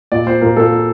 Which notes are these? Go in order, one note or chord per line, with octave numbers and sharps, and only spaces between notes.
A#2 D5
A#2 C5
A#2 A#4
A#2 A4
A#2